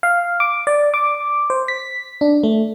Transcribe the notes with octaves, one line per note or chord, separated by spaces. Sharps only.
F5
D6
D5
D6
C5
B6
D4
A3